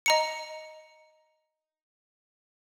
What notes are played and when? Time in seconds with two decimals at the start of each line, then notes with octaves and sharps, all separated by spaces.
0.06 D#5 A#5 C#7